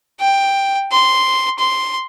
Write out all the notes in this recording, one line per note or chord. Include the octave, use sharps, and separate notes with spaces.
G5
C6
C6